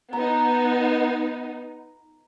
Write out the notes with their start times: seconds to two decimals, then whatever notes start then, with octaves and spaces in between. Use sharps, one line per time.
0.13 B3 D#4 A#5